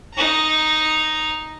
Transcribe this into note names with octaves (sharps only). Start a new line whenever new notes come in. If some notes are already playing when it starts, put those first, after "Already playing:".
D#4 A#5